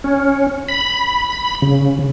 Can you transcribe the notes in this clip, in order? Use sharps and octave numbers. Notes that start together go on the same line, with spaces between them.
C#4
B5
C#3